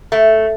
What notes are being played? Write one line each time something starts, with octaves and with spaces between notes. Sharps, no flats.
A3